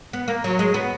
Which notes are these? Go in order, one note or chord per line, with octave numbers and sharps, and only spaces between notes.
B3
A#3
F#3
G#3
B3